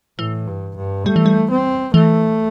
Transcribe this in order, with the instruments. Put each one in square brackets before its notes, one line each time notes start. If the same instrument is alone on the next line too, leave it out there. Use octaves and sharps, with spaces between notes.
[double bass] A2 [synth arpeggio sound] E3
[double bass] G2
G2
[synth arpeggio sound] G3 [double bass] A3
[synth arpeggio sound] E3
G3
[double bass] C4
[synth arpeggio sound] E3 [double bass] A3